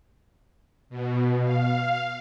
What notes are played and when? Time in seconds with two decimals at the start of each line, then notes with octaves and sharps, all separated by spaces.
0.90 B2
1.43 F5